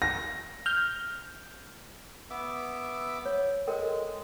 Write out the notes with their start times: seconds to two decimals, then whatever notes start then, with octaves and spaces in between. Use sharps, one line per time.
0.02 A#6
0.66 F6 G6
2.30 B3 E5 D6
3.25 C#5
3.67 G#3 A4 A#4 G5